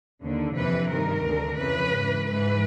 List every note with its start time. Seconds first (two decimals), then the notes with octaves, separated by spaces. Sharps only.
0.23 D#2 D3
0.56 F2 C3 E3 B4
0.90 G2 D#3 A#4
1.24 D2 D3
1.58 F2 C#3 E3 B4
1.92 G#2 E3
2.26 G#2 E3 B4